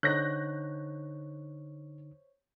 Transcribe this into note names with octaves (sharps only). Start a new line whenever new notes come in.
D3 D#4 C5 C#5 C#6 F#6 G6 A#6